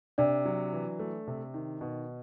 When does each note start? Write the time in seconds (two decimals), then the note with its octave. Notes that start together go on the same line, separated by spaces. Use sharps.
0.18 C3 D4 D5
0.45 F#3
0.72 E3
0.99 A3
1.27 C3
1.54 D#3
1.81 B2